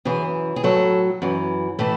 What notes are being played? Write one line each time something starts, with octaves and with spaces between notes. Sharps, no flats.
F#2 E3 G#4
G#4
A2 F#3 A4
F#2 E3
A2 E3 A4